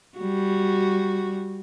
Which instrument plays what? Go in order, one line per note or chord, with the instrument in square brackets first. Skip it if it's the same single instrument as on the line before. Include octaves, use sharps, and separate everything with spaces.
[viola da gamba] G3 F#4